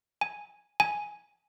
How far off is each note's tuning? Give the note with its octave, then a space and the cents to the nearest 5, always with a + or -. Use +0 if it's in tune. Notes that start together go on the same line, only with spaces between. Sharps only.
G#5 -5
G#5 +0